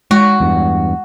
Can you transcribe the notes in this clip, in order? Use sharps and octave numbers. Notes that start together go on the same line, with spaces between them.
G#3 F#4
E2 G2